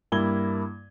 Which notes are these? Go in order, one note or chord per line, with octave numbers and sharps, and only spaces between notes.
G2 A#3 E4 G#6 G7